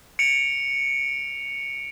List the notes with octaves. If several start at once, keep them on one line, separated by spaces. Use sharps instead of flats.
C#7 D7 F7